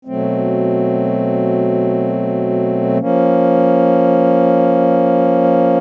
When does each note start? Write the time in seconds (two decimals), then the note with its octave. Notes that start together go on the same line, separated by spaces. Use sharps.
0.05 B2 F#3 A3 C4
2.98 F3 A#3 C#4